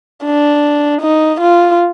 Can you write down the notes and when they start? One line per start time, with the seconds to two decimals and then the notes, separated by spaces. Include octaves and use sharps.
0.25 D4
1.01 D#4
1.40 F4